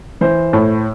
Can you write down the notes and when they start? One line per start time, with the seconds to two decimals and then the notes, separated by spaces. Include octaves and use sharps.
0.21 E3 C5
0.53 A2